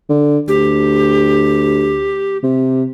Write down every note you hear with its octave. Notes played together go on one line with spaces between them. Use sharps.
D3
D2 G4
C3